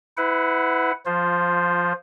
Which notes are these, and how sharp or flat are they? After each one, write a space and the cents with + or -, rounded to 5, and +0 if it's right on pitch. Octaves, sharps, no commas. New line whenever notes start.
E4 -10 B4 +35 F#5 +0
F3 +0 F4 +20 C5 +0